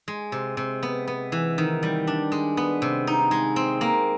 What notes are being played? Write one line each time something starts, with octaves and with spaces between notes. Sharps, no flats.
G#3
C3
C3
B3
B3
E3
D#3
G3
D4
G#3
B3
C3
D#4
G#3
C4
A#3